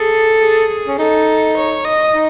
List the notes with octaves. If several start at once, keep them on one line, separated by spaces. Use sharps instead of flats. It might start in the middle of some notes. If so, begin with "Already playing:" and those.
Already playing: G#4 A4
G#4
C#4
D#4 A4
C#5
D#5
D#4